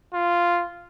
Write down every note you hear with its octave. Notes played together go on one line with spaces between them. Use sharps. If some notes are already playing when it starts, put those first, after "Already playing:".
F4